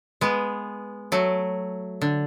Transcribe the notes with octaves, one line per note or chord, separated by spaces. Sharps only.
G#3 B3
F#3 A3
D3